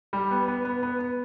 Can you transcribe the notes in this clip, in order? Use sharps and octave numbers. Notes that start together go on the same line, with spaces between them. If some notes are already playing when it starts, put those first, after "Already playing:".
G3
B3
B3
B3
B3
B3